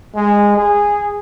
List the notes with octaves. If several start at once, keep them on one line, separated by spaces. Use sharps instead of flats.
G#3
G#4